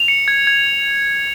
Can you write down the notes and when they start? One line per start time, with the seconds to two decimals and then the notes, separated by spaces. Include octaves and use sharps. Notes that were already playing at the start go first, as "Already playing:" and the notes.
Already playing: F7
0.08 C#7
0.28 G#6
0.47 G#6